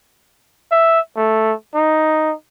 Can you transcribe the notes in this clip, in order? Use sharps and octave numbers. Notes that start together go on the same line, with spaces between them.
E5
A3
D#4